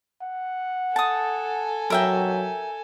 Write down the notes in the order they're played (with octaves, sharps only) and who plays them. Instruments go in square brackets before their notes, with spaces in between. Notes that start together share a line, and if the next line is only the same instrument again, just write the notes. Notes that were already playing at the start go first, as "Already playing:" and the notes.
[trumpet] F#5
[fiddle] A4 G#5 [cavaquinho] A5 D#6
[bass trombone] F#3 [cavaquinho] A#4 E5 G5